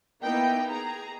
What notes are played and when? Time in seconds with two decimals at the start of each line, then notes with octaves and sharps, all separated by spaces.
0.22 A#3 B3 D#4 E4 G5
0.71 G#4 A#5